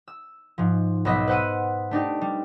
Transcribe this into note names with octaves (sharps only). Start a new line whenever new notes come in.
E6
G#2 F3
B1 B3 D#5 E5 B6
B4 C5 F#5 E6 D#7
A3 D4 D#4 G4
G3